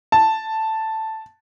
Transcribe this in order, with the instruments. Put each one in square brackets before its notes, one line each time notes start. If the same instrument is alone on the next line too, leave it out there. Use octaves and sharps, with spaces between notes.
[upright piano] A5